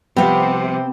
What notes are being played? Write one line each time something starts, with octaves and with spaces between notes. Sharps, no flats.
C2 C3 F3 G3 B3 C4 F5